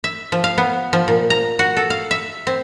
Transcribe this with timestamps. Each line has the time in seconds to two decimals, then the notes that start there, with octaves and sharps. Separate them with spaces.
0.04 E5
0.32 F3
0.44 F5
0.58 B3
0.93 F3
1.08 A#2
1.30 A#5
1.59 F#4
1.77 A4
1.90 F5
2.11 E5
2.47 C4